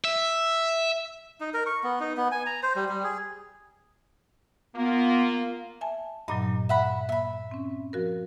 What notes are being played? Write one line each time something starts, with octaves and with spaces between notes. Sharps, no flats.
E5
D#4
A#4
C#6
B3
D#4
B3
G#5
A#5
C5
G3
G3
G#4
A#3 B3 F4
E5 G#5 A5
G2 A#2 F#3 D#4
E5 F#5 B5
A#3 E5 B5
C4 C#4
F3 F#4 A#4